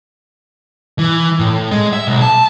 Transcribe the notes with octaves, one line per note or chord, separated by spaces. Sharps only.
E3
A2
G#3
E5
B1
A5